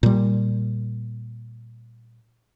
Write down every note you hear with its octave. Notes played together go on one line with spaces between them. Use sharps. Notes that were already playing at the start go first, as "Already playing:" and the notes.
A#2 G3